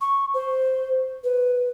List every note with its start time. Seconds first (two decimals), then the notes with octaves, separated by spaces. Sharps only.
0.01 C#6
0.34 C5
1.24 B4